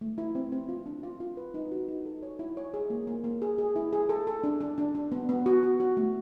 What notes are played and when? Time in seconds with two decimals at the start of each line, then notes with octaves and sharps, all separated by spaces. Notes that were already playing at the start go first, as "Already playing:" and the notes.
0.01 A3
0.18 E4
0.35 C4
0.52 C4
0.69 F4
0.86 D4
1.03 F4
1.20 F4
1.37 B4
1.54 D#4
1.71 F#4
1.88 D#4
2.05 A4
2.23 C#5
2.39 E4
2.57 C#5
2.74 G#4
2.90 A#3
3.07 A#3
3.24 A#3
3.42 G#4
3.58 G#4
3.76 E4
3.93 G#4
4.09 A4
4.27 A4
4.44 D4
4.60 D4
4.78 D4
4.95 D4
5.12 B3
5.29 B3
5.46 F#4
5.63 F#4
5.80 F#4
5.97 A3